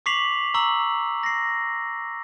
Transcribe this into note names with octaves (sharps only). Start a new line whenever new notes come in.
C#6 D6 B6 C7 F7 F#7
A#5 C#6 E6 F#7
A#6 C7